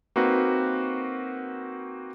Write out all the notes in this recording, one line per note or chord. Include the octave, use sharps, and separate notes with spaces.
A#3 C4 D#4 F#4 A#4 B4